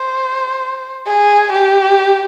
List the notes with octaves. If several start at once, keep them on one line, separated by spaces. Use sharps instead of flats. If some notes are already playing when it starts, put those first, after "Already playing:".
Already playing: C5
G#4
G4